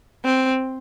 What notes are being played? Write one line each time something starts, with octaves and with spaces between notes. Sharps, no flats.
C4